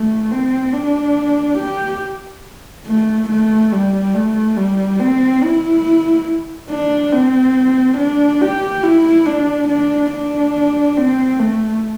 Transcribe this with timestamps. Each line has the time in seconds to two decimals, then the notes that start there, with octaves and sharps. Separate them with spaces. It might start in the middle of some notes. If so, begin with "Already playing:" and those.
Already playing: A3
0.31 C4
0.73 D4
1.59 G4
2.87 A3
3.29 A3
3.72 G3
4.15 A3
4.57 G3
5.00 C4
5.43 E4
6.70 D4
7.13 C4
7.98 D4
8.41 G4
8.83 E4
9.26 D4
9.69 D4
10.11 D4
10.97 C4
11.39 A3